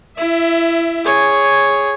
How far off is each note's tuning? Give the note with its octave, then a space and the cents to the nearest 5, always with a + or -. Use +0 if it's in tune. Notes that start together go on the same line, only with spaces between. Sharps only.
E4 +25 E5 +0
G#4 +0 C#5 +0